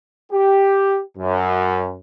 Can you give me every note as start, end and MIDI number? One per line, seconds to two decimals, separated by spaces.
0.32 1.01 67
1.18 1.97 42